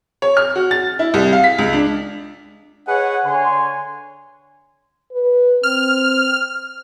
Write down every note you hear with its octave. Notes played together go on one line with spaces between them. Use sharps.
C#5
F6
F#4
A6
E4
C2
F5
B6
C#2
D4
G#4 B4 C#5 D#5 F#5
D3 C#5 G#5 C6
B4
C4 F6